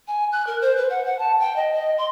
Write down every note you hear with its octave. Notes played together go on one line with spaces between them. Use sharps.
G#5
F#6
A#4
C5
B4
F#5
F#5
A5
G5
D#5
D#5
C6